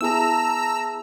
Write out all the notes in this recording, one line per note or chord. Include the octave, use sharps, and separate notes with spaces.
B3 E4 G#4 A5 A#5 E6